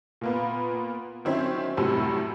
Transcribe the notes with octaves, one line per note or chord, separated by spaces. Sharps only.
A#2 A#3 B3
D#3 F#3 C4 C#4 E4
F#2 A2 C3 G3 F#4